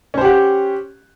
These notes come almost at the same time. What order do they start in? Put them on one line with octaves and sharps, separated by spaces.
C#4 C5 G4 F#5